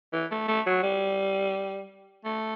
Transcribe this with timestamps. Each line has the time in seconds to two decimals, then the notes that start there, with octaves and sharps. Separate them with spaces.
0.13 E3
0.31 A3
0.48 A3
0.66 F#3
0.83 G3
2.25 A3